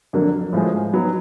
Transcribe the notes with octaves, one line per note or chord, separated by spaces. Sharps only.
F2 D3 F#3 A#3
A2 F3 G#3
F#3 B3 D#4